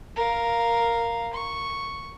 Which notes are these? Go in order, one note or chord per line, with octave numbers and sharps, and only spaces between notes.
A#4 F5
C#6